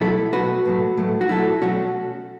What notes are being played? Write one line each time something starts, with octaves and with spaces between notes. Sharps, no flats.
B2 F#3 A3 E4 A4
B2 F#3 A3 F#4 B4
A2 F#3 A3
A2 F#3 A3
F#4
B2 F#3 A3 E4 A4
B2 F#3 A3 C#4 F#4